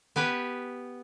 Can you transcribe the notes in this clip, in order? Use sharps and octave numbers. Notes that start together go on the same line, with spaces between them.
B3 G4 B4 G#5